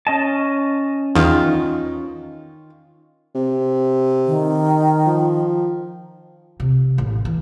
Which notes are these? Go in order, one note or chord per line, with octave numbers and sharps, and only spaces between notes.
C#4 D#5 A5
E2 D#3 D#4 F4
C3
D#3
F3
C3
A1
E3